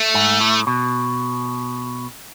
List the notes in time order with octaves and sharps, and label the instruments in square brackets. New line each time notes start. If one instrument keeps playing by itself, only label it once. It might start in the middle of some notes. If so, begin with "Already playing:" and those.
Already playing: [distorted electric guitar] A3
[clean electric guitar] G#2
A2
B2